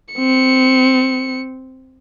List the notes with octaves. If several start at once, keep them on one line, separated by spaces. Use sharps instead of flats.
C4 C#7